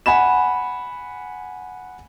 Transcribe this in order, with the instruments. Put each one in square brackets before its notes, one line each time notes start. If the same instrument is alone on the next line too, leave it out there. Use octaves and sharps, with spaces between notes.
[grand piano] F#5 G#5 B5 E7